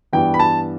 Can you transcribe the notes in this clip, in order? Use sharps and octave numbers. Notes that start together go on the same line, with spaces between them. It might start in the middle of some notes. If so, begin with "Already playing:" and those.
G2 E3 B3 G5
B5
A5